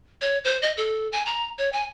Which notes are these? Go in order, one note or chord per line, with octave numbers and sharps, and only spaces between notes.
C#5
C5
D#5
A4
G#5
A#5
C#5
G#5